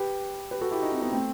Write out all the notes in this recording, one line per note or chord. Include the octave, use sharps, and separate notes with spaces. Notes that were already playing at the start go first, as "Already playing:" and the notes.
Already playing: G4 B4
G4 B4
F#4 A4
E4 G4
D#4 F#4
C4 E4
B3 D#4
A3 C4